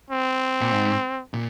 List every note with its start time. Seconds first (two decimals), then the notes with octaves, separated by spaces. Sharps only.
0.10 C4
0.61 A#2
0.72 G#2
1.34 A#2